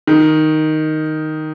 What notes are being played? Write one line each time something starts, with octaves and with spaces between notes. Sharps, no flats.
D#3